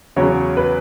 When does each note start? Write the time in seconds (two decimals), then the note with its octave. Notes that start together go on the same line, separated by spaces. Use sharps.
0.16 E2 C#3 F#3 C#5
0.57 B4